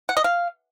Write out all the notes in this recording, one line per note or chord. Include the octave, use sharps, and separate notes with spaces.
F#5
D#5
F5